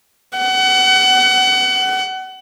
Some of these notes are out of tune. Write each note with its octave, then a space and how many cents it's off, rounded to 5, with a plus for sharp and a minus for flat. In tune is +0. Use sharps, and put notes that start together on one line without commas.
F#5 +30